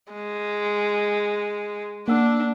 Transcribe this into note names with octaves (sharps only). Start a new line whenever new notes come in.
G#3
A#3 D4 F#5 E6